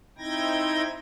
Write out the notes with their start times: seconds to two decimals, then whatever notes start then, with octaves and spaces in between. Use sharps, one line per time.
0.18 C4 D#4 E4 G5 G#6 A#6